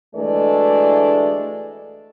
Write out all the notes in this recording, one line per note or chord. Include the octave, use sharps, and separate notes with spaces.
D2 E3 G#3 A3 D4 D5